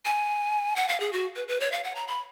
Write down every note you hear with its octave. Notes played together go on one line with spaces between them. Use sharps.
G#5
F#5
F5
G#4
F#4
B4
B4
C#5
F5
F#5
A#5
B5